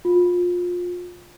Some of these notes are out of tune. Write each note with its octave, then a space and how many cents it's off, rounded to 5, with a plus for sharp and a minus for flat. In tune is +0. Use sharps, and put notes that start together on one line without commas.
F4 +25